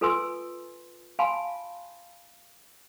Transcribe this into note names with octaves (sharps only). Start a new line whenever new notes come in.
F4 A4 B4 G#5 C6 E6
F5 G#5 A5 B5 C6